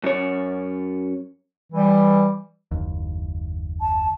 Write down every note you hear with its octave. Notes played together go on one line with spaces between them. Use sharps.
F#2 C#5
E3 G3
F#1 D#2
A5